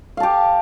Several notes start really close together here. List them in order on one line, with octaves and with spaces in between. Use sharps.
F5 A5 G4